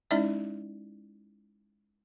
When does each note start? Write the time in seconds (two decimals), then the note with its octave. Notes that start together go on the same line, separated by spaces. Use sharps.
0.11 G#3 C#4 D#4 E4 D5 E5